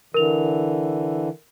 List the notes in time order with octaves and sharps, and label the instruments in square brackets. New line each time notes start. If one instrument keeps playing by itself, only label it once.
[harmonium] D3 E3 [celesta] A#4 F7